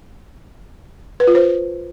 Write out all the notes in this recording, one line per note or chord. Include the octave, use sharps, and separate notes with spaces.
B4
F4
C5